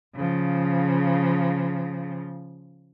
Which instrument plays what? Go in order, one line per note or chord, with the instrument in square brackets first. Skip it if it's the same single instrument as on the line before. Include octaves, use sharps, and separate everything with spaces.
[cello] C#3 F3